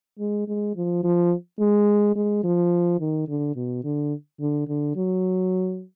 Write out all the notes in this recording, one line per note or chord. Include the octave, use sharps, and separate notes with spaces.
G#3
G#3
F3
F3
G#3
G#3
F3
D#3
D3
B2
D3
D3
D3
F#3